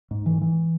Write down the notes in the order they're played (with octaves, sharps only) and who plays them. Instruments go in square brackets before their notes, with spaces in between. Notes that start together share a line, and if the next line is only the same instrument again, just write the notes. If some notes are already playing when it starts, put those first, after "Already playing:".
[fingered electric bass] G#2
E3
E3